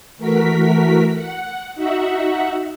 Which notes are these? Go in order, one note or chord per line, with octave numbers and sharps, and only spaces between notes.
E3 A3 F#4 A#4 B6
F#5
D#4 F#4 E5 F#5